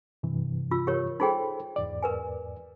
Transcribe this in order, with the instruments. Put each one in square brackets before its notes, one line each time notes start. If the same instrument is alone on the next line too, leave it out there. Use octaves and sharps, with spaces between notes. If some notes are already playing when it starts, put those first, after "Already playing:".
[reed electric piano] G2 C3 E3
[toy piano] F4 E6
G4 A#4 C#5
[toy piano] D#4 G#4 G5 [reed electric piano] A4 C5 B5
[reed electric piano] E2 G#2 D5
[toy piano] A#4 B4 G#5